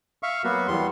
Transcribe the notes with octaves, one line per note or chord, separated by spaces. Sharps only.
E5 F5 C#6
F#3 A#3 B3 F#4
E2 G3 B3 C6